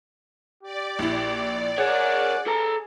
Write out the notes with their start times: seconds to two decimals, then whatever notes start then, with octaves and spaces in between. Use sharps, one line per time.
0.63 G4 D5
0.99 A#1 E4
1.78 G#4 A#4 C#5 F#5
2.47 A4 A#5